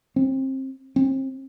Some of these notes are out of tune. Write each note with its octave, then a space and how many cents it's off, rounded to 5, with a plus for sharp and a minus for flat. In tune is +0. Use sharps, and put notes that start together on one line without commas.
C4 +25
C4 +35